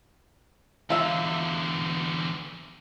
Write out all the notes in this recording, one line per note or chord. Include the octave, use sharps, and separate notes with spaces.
E2 D3 F4 E5